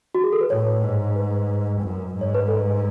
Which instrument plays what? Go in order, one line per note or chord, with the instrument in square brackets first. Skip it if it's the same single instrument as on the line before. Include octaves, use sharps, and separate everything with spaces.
[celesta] F#4
G#4
A4
B4
[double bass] A2 [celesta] C#5
[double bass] G#2
[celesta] B4
[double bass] F#2
G#2
[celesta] C#5
B4
A4